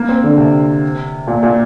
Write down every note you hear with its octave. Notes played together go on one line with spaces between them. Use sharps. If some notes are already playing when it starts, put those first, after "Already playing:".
Already playing: A#3
C4
D3
C3
A#2
A#2